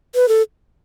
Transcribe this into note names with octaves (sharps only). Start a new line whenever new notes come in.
B4
A4